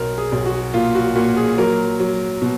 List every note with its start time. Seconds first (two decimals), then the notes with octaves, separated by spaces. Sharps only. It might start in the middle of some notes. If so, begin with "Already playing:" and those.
Already playing: B1 A#4
0.18 G#4
0.32 B1
0.46 F#4
0.74 A#2 F4
0.95 F#4
1.16 A#2 F#4
1.37 G#4
1.58 F#3 A#4
1.99 F#3
2.42 B2